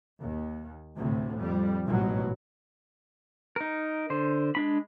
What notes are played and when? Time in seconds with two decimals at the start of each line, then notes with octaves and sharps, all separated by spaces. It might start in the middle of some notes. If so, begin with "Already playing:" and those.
0.20 D#2
0.97 D2 A2 C3
1.39 F2 G3
1.86 A1 G#2 B2 F#3
3.56 D#4 A#4
4.10 D3 C5
4.55 G#3 D4 B5